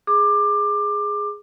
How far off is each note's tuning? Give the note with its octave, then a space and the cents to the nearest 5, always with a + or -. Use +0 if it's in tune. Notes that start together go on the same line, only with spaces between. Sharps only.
G#4 +0 D6 +20